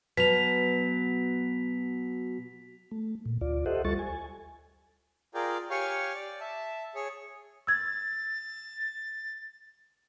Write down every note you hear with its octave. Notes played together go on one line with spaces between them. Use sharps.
B2 F#3 B4 B6 F7
A3
A#2
D2 F4 D5
G4 A4 C5 D#5 E5 F#5
D2 G3 F4 A4 C#6 A6
G#5
F4 G#4 A#4 D5 G5
G4 C#5 F5 G#5 C#6
D5
E5 A5
G#4 C#5
E6 G#6 A6